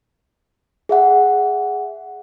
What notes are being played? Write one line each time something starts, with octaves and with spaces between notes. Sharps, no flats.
G#4 E5 F#5